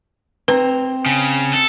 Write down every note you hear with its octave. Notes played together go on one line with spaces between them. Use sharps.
C4 B4 A#5
C#3
A4